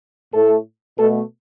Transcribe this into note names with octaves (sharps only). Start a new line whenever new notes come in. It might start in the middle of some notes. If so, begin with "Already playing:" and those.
A2 A3 A4
B2 A3 A4